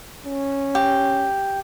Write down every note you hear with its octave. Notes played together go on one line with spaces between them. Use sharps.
C#4
G4